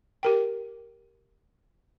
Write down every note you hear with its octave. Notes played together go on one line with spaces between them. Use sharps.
G4 A#4 G5